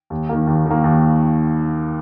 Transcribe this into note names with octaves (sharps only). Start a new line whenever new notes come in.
D#2
D#3 A#3
D#2
D#3 A#3
D#2